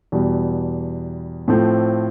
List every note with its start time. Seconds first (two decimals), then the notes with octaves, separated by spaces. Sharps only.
0.12 E2 B2 G3
1.48 A2 F3 A3 C4